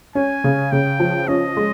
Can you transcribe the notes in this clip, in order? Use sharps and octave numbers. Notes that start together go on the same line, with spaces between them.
C#4 G#5
C#3
C#3 G5
F3
C#4 D#5
G#3